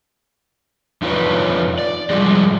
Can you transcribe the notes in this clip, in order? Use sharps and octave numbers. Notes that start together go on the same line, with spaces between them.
F2 D#4 F4 B4 C#5 D5
D5
G#2 F3 G3 G#3